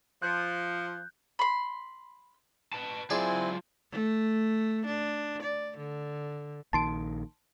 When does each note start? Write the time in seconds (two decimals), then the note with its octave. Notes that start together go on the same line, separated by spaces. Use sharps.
0.22 F3 F#6 G6
1.39 B5 C6
2.73 B4 A5
3.10 F#3 C4 E4 F4 G#4 D5 G#5
3.92 A3
4.86 D4
5.43 D5
5.78 D3
6.73 A#1 A#2 D#3 A5 C6 D7